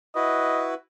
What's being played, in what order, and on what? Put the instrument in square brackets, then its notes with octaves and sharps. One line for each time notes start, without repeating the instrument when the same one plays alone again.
[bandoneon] E4 F#4 B4 [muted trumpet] D#5